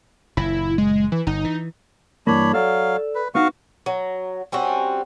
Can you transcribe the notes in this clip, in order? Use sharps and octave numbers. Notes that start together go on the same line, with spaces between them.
F#1 A#2 E4
G#3
E3
G1 D#4
E3
G2 E3 A#3 D4 C#5 B5
F#3 A4 D5 F5
B4
B3 D#4 F#4 F5 C#6
F#3
G3 C4 C#4 F#4